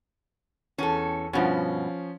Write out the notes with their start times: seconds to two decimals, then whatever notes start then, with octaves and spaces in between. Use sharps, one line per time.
0.78 E2 C#4 A4
1.33 G2 B2 F3 C#4